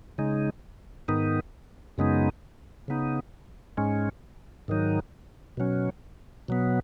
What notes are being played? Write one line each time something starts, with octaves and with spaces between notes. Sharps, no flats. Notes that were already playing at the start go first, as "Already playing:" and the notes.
C#3 G#3 D#4
G#2 D#3 B3 D#4
F#2 C#3 G#3 B3 D#4
C#3 B3 D#4
G#2 G#3 C#4
G#2 D#3 F#3 D#4
B2 F#3 C#4
B2 F#3 B3